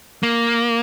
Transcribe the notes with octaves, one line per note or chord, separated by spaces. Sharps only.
A#3